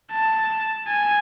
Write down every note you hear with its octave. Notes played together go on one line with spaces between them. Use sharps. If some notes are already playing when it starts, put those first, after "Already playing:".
A5
G#5